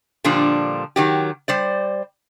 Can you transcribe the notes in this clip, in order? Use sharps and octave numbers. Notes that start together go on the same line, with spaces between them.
A#2 D3 F3 G3 D4
D#3 F#3 G4
G3 C5 D5